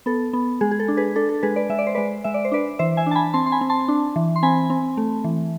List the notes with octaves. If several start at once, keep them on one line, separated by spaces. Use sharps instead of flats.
B3 A4
B3
G#3 G#4
G#4
A4
D4
G#4 B4
D4 A4
A4
G#3 G#4 B4
B4 D5
G#3 E5
D5
C5
G#3 B4 D5
G#3 E5
D5
C5
D4 B4 D5
E3 C5 E5
E5 G#5
D4 A5
G#5 B5
C4 A5 C6
C6
G#5 B5
C4
A5 C6
D4
E3
C6
C4 G#5 B5
C4
A3
E3